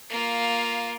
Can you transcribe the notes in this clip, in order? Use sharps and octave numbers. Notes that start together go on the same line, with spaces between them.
A#3 F4